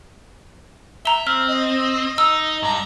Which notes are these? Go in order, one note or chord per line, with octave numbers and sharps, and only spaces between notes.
E5 A#5 G7
C4 F6
D#5
D#4 E6
G2 A#5